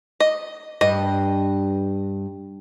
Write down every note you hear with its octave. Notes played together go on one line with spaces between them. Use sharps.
D#5
G2 D#5